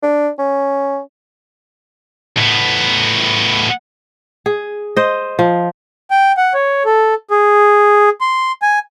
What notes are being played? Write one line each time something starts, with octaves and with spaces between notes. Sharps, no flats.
D4
C#4
A2 B3
G#4
C5 D#5
F3
G5
F#5
C#5
A4
G#4
C6
G#5